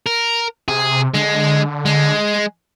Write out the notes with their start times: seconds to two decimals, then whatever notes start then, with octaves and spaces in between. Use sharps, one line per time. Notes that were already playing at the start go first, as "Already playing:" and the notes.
0.06 A#4
0.68 C3 G#4
1.14 D3 G#3
1.85 G#3